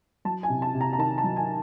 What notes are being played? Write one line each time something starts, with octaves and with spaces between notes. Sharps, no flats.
F#3 A5
G#5
C3
A5
C3
A#5
A#5
D#3 A5
A5
F#3
G#5